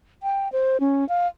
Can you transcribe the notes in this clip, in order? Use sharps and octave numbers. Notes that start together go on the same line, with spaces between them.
G5
C5
C#4
F5